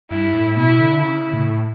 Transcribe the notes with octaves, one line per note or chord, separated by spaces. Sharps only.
G2 E4
A2
B2 E4
D3
C#3 E4
A2